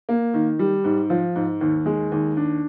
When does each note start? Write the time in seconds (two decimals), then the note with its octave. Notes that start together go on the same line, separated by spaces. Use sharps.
0.09 A#3
0.34 D#3
0.59 G3
0.84 G#2
1.10 F3
1.36 G#2
1.61 D#2
1.86 G#3
2.12 D#2
2.37 D4